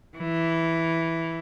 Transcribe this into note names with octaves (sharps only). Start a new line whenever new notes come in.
E3